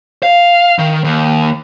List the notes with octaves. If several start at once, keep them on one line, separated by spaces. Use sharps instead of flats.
F5
D#3
D#2